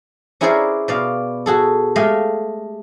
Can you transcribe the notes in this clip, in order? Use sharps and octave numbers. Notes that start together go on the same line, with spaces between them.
C#4 E4 G#4 A#4 C5 D5
B2 D5 F5
F#4 G#4 A4
G#3 A3 G4 D#5 F5